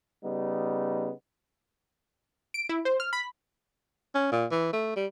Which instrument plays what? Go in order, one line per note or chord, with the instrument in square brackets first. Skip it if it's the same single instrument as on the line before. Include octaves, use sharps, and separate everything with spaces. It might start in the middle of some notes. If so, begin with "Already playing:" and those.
[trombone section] C#3 G3 B3 D#4
[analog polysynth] D7
E4
C5
F6
B5
[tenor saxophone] C#4
A#2
E3
A3
G3